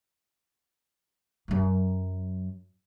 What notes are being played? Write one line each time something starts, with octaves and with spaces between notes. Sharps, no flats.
F#2 F#3